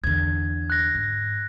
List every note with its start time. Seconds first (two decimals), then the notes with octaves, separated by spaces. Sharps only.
0.04 E2 D3 G#6
0.70 F#6 A#6
0.95 G#2